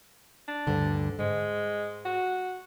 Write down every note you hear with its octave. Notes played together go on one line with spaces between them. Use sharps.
D4
D2 G2 D3
G#2 G#3
F#4